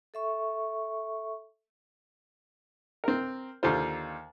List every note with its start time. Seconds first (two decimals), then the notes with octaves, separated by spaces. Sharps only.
0.14 A4 E5 C#6
3.04 C4 A#4
3.63 D#2 D3 F4 C5